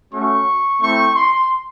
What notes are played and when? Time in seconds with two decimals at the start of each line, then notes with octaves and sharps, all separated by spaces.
0.12 A3 C#4 F#4 C#6
0.80 A3 C4 E4 C#6
1.14 C6